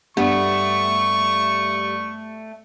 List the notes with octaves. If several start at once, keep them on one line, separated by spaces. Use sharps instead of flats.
G2 A3 B3 C#6